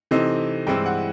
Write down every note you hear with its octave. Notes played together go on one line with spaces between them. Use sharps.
C3 E3 A3 C4 D#4
G2 E3 G#3 C4 E4 G5
F#5